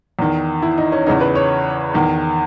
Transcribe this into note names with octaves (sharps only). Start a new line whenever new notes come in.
E2 D#3
E4
D#4
C#4
E2 C#3 E3 D#4
B4
C#5
E2 D#3